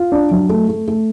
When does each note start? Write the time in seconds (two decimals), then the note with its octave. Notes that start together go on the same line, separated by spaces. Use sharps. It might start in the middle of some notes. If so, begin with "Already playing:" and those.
Already playing: F4
0.12 D4
0.31 F#3
0.49 A3
0.69 A3
0.88 A3